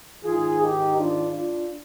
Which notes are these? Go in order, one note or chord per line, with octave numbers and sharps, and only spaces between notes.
G#2 D#3 F4 G#4
D#4 G4
D4 F4
D4 F4